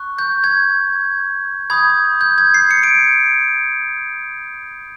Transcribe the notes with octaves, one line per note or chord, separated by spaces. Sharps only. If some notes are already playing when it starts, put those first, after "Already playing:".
Already playing: C#6 F#6
G6
G#6
B5 D#6 G6 G#6
G6
G#6
C7
C#7
D7